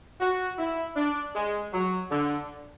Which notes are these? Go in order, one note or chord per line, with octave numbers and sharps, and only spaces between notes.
F#4
E4
D4
G#3
F#3
D3